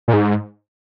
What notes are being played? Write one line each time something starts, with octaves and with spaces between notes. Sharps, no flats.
A#2
G#2